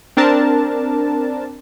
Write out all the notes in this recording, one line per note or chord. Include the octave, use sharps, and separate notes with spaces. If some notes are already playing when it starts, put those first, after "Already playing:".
C4 D4 A#4 A5